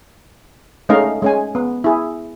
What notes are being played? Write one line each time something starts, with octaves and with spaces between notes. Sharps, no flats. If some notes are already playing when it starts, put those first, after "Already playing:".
G#3 A3 C#4 D#4 D#5 F5
G#3 C#4 G#5
B3
E4 G#4